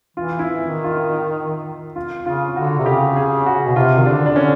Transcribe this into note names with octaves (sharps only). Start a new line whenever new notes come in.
E3 F4
E4
D#3
F4
F4
C#3 F4
D3 F#4
C3
C#3 G4
G#4
F#4
B2
C3 F4
D#3
D3 D4
D4
D3 C#4